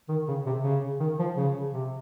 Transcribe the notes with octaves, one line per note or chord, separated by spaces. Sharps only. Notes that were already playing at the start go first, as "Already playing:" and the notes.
D#3
C#3
C3
C#3
D#3
F3
C#3
C3